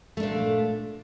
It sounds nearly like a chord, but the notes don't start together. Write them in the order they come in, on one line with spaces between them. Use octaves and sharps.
A3 D4 A#2